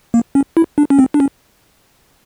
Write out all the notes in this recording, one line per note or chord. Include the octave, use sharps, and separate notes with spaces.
A#3
C#4
E4
D4
C#4
C4
D4
C#4